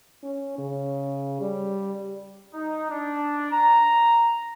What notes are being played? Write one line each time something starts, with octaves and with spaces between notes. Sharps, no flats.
C#4
C#3
G3
D#4
D4
A#5